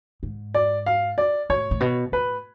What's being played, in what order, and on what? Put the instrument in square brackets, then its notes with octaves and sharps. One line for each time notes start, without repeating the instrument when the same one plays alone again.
[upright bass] G#2
[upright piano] D5
F5
D5
[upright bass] A2 [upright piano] C#5
[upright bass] A2
B2
[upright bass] A2 [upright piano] B4